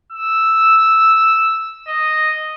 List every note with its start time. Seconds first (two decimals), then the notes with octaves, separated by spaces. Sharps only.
0.12 E6
1.88 D#5